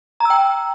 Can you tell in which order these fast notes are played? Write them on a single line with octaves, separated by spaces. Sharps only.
A#5 E6 G5